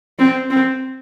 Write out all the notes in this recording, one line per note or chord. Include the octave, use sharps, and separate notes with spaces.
C4
C4